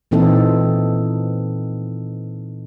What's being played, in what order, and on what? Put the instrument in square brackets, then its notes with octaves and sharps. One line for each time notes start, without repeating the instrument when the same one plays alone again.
[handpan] A#2 E3 C4 D#4 A4